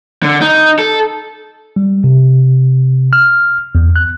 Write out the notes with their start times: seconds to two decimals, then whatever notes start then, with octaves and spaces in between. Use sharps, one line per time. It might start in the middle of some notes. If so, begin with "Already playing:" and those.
0.22 D3
0.41 D#4
0.79 A4
1.76 G3
2.04 C3
3.13 F6
3.75 E2
3.96 F#6